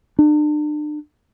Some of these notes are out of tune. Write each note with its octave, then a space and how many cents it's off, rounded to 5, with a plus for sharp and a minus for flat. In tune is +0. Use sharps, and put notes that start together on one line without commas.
D4 +40